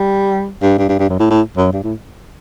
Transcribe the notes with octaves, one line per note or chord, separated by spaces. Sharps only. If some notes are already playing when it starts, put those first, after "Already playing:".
Already playing: G3
G2
G2
G2
G2
F#2
A2
A2
F#2
G2
A2